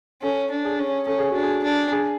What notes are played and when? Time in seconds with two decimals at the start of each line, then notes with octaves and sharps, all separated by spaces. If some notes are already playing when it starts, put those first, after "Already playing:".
0.22 C#4 A4
0.51 D4
0.65 G#4
0.79 C#4
1.07 C#4 A4
1.19 G#4
1.30 D4 F#4
1.43 G#4
1.63 D4
1.92 G#4